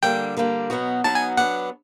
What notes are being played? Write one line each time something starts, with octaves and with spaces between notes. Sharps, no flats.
D3 G3 A#3 D4 G5
D3 G3 A#3 D4
B2 F#3 B3 D#4 F#4
B2 F#3 B3 D#4 F#4 A5
G#5
F#3 B3 D4 F#5